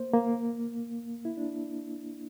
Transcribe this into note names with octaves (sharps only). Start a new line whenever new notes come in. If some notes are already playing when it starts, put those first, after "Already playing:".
Already playing: A#3 C5
A#3
E4
D4